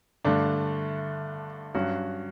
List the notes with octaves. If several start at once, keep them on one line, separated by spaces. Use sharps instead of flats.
G2 D3 A3 D4
G2 F#3 C#4 F#4